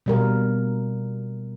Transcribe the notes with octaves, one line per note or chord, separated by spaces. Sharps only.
B2 G3 A#4